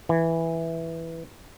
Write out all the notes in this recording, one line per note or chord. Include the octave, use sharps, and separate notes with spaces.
E3